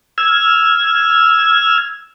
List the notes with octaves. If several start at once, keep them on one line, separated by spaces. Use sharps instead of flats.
E6 F6 G#6